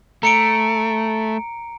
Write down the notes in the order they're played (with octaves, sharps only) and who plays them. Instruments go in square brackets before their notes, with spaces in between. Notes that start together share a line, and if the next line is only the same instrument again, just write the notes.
[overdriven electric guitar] A3 [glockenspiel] A#5 C#7 D7